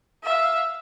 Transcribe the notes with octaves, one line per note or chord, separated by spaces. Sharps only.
E5 F5